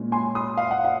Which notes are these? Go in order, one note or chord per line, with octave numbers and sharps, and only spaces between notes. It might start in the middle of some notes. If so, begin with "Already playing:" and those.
Already playing: A#2 G#3 C#4
G#5 C6
C6 D#6
F5
F#5
F5